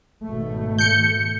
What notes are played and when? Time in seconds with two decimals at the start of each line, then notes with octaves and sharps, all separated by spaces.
0.24 G#1 B2 A3
0.79 G6 C#7